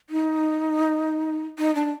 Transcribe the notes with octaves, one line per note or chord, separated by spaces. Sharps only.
D#4
D#4
D4